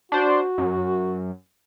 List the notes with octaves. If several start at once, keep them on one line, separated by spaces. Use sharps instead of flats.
D4 F#4 C5
F#2